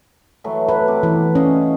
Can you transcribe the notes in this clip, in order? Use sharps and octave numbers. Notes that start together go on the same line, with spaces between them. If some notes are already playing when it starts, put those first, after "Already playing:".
E3 F#3 A3
B4
C3 D6
E3 B3
C#4 D#5 F5